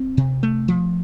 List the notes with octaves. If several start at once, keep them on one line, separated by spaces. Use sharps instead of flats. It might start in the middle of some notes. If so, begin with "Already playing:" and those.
Already playing: C4
C3
A3
F3